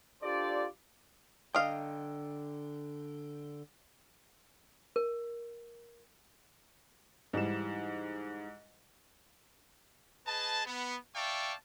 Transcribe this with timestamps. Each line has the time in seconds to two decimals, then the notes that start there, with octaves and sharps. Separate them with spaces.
0.23 D4 F4 G4 A4 C5 D5
1.55 D3 D#5 F5 G5
4.96 A#4
7.33 G#2 E3 G3 E7
10.27 G#4 B4 D#5 A5
10.66 B3
11.15 D5 E5 F5 G5 A5 C#6